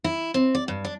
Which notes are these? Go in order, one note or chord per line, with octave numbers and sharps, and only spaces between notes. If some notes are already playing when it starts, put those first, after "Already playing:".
E4
C4
D5
G2
D4